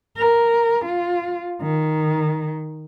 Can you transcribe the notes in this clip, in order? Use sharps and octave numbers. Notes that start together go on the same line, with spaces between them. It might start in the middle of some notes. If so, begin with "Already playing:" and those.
A#4
F4
D#3